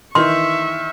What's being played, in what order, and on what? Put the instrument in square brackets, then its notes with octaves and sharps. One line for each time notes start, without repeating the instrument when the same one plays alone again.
[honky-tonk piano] D#3 E3 [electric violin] E5 C#6 [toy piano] C6